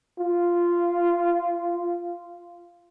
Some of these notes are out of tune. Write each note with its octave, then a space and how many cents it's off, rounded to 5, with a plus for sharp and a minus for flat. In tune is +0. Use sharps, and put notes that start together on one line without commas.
F4 -10